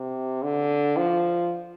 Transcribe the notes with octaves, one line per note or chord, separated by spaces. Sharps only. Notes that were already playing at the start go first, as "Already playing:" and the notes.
Already playing: C3
D3
F3